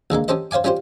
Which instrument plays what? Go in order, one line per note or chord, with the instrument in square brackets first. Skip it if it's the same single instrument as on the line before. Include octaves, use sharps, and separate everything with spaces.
[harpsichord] C2 D3 G#3 A#3
C#4 G4 A4 C5 D#5
C5 C#5 F5 G#5 D6
G3 C#4 F4 G4 C5